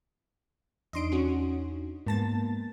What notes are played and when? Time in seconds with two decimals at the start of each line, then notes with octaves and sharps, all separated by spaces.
0.93 E2 D4 D#4 D#5 C6 D7
1.12 C#4 F#4
2.07 G#2 A#3 B3 A5 A6